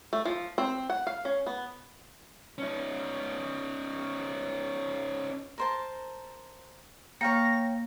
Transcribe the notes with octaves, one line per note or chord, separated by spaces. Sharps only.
A3
F3
C4
F#5
F5
C#4
B3
C#4 D#4
A#4 C5 A5
A#3 C#5 F5 G5 A#6